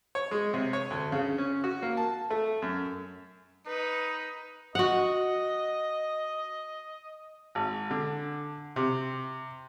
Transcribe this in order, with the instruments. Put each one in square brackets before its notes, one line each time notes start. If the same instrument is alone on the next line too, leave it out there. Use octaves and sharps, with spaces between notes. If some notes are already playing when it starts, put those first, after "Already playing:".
[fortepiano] C#5
G#3
C3
C#5
D2
C#3
C#4
F#4
A#3
A5
A3
F#2
[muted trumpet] D#4 [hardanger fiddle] B4
[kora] F#4 F#5 [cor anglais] D#5
[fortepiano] G#1
D3
C3